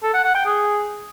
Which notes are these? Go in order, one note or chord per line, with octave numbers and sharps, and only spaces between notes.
A4
F#5
F#5
G5
G#4